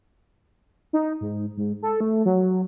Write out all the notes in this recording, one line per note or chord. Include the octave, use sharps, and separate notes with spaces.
D#4
G#2
G#2
A4
A3
F#3